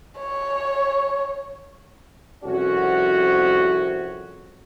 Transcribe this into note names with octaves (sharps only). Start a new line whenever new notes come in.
C#5
C2 F2 C#4 F#4